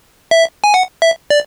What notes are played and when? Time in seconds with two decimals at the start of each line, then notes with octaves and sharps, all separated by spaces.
0.31 E5
0.64 G#5
0.74 F#5
1.02 E5
1.30 D5